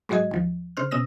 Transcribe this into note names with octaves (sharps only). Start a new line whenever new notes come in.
G#2 F#3 G#3 F#4 D#5 G#6
D#2 F3
C#3 C5 F6
B2 C#4 D#6 E6 A#6